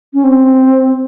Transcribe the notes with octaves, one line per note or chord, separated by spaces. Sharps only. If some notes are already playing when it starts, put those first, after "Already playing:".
C#4
C4